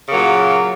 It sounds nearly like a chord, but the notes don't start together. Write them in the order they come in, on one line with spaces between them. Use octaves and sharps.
C#3 A#3 F#3 A#2